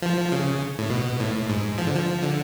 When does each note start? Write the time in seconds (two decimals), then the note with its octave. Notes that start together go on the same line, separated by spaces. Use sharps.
0.02 F3
0.32 C#3
0.79 A2
0.90 B2
1.20 A2
1.50 G#2
1.78 F3
1.87 D3
1.95 F3
2.23 D3